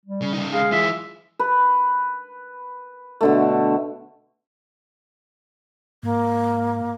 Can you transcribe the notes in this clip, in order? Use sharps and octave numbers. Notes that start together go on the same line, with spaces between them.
G3
C#3
C#3 D#4
G#3 F5
E3 F4 E5
B4
B2 D3 A3
G#2 A#3